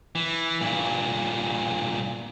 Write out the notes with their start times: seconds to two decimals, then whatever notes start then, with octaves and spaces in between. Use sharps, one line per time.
0.15 E3
0.61 G2 A#2